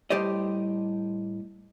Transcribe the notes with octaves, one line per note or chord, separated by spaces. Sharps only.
A2 G3 G4 C5 D5 D#5